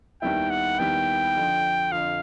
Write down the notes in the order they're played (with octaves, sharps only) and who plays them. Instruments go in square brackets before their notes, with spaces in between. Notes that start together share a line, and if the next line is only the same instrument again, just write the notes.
[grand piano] D#2 D#3 G3 B3 E4 [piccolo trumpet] G5
[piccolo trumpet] F#5
[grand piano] D#2 D#3 G3 B3 E4 [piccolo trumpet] G5
[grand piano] F2 D3 F3
[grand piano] F2 D3 F3 [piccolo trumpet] F5